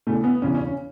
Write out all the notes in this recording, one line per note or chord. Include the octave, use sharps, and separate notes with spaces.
E2 C#3 E3 A3
B3
E2 C#3 E3 C#4
C#4
C#4